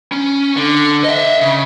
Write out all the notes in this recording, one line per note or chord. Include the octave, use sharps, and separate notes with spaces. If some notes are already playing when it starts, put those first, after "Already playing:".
C#4
D3
D#5 E5
C#3